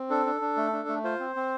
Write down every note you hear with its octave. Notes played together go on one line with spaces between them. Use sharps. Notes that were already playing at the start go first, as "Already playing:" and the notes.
Already playing: C4
D4 A4
D4
D4
A3
D4
A3
F4 C5
C4
C4